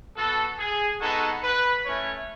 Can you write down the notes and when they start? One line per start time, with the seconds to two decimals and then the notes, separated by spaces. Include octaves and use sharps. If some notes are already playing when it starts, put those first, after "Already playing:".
0.16 B3 F#4 A4
0.59 G#4
1.00 G#3 B3 D#4 F#4 A4
1.43 B4
1.85 A3 C#4 E4 C#5